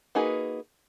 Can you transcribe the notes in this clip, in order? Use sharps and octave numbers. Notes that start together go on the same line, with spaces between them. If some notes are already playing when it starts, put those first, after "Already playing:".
A#3 D#4 F#4 G#4 B4